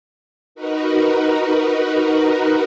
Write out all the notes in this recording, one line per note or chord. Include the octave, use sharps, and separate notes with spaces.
D#4 F#4 A#4 B4